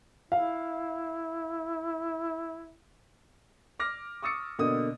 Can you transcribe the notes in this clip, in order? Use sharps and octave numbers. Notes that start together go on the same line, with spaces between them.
E4 F5
D6 F6 A#6
C#6 D#6 E6 A6 C#7
B2 D3 A#3 D#5 D#6